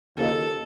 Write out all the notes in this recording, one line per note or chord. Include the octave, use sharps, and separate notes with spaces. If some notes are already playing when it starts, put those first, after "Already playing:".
D#2 C#3 F3 A#3 D#4 A4